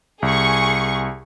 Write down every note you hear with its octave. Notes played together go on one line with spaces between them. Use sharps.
C2 G#4 C#6